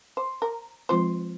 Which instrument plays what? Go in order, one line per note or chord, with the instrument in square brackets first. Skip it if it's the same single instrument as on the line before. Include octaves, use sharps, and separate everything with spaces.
[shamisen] C5
A#4
[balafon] F3 G#3 C4 F4 [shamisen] C5